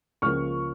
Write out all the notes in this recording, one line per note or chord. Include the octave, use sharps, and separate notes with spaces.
C#2 C#3 F3 A#3 C#6 F6